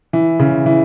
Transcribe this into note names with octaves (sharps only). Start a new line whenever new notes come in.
E3
C#3
E3